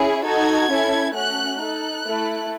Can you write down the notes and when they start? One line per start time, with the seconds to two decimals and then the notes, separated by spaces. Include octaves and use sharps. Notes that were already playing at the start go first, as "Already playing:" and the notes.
Already playing: C#4 E4 G#4
0.25 D#4 F#4 A4 G#6
0.70 C#4 E4 A4
1.15 A3 C#4 F#4 F#6
1.60 D#4 A4 F#6
2.05 A3 E4 A4